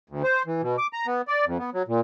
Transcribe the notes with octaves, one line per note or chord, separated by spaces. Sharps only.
D2
C5
E3
B2
D6
A#5
B3
D5
F2
B3
F#3
A#2